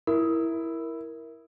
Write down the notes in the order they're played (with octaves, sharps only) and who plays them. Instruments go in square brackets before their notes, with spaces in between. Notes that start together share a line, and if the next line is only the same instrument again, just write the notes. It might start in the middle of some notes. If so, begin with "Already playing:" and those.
[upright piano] E4 [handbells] A#4